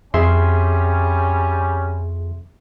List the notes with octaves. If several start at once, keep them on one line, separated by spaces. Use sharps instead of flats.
F2 G3 C#4 G#4 E5 C6